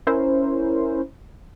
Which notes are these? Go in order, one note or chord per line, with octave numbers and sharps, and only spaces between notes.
C#4 E4 A#4 C5